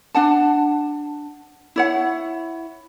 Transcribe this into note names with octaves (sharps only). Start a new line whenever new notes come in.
D4 F#5 A5
E4 C#5 F#5